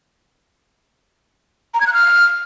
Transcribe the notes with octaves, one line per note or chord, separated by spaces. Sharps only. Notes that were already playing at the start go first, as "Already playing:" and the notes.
A#5
G#6
F#6
F6